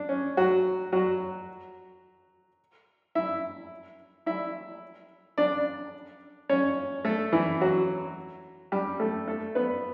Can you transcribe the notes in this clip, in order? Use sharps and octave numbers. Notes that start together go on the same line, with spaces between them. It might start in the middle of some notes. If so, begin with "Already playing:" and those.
Already playing: D4
C#4
F#3 F#4
F#3 F#4
E4 E5
E4 E5
D4 D5
C#4 C#5
A3 A4
E3 E4
F#3 F#4
G3 G4
A3 A4
A3 A4
B3 B4